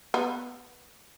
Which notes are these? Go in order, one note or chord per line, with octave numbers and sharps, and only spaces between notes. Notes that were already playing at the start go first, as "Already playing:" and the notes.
B3